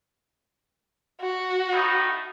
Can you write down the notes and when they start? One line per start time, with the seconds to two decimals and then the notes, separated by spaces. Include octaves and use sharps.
1.21 F#4
1.73 A2 D#4